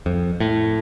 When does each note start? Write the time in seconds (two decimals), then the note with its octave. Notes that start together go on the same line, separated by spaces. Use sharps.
0.06 F2
0.40 A2